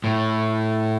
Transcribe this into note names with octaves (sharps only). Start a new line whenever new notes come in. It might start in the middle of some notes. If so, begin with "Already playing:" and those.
A2